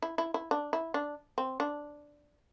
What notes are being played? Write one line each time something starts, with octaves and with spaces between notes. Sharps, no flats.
E4
E4
E4
D4
E4
D4
C4
D4